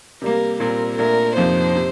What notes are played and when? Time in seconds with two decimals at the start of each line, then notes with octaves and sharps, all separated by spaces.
0.22 C3 G3 A#3 A#4
0.60 A#2 G3 C4 A#4
0.98 A#2 A3 D4 A#4
1.36 F2 C3 F3 A#3 D#4 C5
1.76 C3